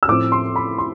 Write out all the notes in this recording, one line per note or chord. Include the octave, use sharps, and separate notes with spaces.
E6
A2 F3 C4 D6
C6
B5
C6